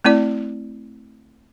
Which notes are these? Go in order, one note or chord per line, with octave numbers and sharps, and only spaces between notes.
A3 C4 E4 D5